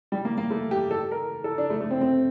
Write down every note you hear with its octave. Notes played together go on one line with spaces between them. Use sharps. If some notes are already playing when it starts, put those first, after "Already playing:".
G3
A#3
A#3
A3
G4
A4
A#4
A4
D4
A3
A3
C4
C4